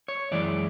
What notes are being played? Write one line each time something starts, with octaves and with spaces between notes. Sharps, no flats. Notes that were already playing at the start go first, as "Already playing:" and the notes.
C#5
F#2 E3 G#3 D5